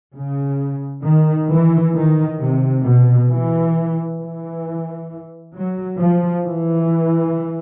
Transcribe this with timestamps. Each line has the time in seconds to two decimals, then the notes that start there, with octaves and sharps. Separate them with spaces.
0.15 C#3
1.04 D#3
1.49 E3
1.94 D#3
2.39 C3
2.84 B2
3.30 E3
4.19 E3
5.54 F#3
5.99 F3
6.45 E3